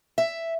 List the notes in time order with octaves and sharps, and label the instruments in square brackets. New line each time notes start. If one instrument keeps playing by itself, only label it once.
[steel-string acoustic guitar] E5